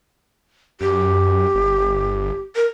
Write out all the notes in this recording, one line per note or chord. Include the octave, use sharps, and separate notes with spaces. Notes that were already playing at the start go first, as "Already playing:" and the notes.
F#2 G4
G1
A#4